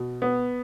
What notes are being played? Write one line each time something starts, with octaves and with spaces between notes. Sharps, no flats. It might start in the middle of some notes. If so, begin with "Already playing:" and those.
Already playing: B2
B3